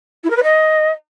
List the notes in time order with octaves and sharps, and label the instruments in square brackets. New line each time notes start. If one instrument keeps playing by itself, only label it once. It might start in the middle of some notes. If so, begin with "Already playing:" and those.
[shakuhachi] E4
A#4
B4
D#5